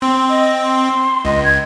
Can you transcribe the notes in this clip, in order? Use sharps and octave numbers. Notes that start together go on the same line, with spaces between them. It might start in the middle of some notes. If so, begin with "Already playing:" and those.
C4 C6
D#5
C6
C#2 D#5
G#6